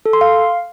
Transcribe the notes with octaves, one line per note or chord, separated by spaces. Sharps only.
A4
C6
F5